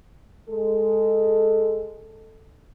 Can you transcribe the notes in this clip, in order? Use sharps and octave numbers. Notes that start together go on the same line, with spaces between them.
G#3 A4